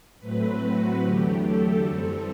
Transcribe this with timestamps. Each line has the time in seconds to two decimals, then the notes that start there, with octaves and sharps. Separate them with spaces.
0.20 A2 F#3 A3 C4 B4
0.61 F#4
1.02 E2 D3 F#3 A3 G4
1.43 A4
1.85 F#2 E3 G3 C4